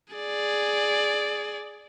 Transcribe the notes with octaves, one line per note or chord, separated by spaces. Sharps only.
G#4 D5